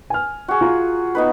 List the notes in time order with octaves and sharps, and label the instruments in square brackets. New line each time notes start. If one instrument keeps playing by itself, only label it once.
[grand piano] G#5 F6
[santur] F#4 G#4
[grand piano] F4 A#5
[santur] B3 D#4 B4